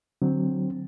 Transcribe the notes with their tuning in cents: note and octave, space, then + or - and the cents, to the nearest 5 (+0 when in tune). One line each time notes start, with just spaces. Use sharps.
D3 +15 F#3 +0 C4 +0